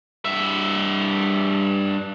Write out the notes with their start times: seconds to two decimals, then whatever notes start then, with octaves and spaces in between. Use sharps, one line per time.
0.25 G2 E5